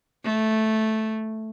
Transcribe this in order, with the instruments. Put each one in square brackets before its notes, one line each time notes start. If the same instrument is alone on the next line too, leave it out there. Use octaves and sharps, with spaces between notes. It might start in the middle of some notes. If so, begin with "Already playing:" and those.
[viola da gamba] A3